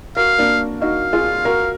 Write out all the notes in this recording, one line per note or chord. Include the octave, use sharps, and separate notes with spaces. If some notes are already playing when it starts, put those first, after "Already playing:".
F#4 A#4 F5
A#3 D4
D#4 F#4 F5
F4 G#4
F#4 A#4